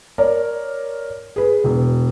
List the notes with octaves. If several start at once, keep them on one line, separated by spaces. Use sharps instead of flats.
A#4 C#5 D5
G#4 B4
E1